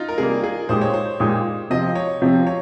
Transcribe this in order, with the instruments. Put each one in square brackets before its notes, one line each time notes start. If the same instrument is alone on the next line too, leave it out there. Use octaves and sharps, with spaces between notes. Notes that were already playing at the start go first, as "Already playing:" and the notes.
Already playing: [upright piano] D#4 F4
A#4
[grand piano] C3 G3 A#3 [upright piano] G#4
[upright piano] G#4
[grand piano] A#2 G#3 D#4 G4 [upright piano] C5
[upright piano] C#5
C5
[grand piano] A#2 G#3 D#4 G4
[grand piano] C3 F3 C4 [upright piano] D#5
[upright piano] C#5
[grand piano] C3 F3 C4
[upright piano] C#5